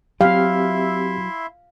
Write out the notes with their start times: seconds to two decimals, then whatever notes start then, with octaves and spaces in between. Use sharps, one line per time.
0.21 F#3 C4 E4 G4 E5 F5 C6